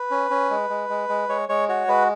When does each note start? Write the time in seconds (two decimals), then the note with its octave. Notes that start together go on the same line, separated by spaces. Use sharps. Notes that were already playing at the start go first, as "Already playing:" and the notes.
Already playing: B4
0.11 C#4
0.31 C#4
0.50 G#3
0.70 G#3
0.89 G#3
1.09 G#3
1.29 G#3 C#5
1.49 G#3 C#5
1.69 F#4 C#5
1.88 G#3 B4